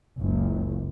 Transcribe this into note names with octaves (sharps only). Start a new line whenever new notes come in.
F#1 C#2